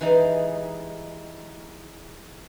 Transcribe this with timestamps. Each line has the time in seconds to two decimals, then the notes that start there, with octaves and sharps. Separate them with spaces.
0.01 E3 G3 G#3 D#4